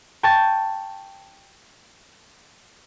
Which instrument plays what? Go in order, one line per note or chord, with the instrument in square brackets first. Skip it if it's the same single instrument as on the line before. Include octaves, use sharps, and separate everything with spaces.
[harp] G5 A5 C#6 G6 A6